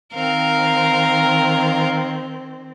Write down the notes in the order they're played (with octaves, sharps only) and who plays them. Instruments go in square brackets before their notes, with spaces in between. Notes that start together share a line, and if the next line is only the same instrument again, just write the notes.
[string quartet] D#3 C4 [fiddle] A#4 F5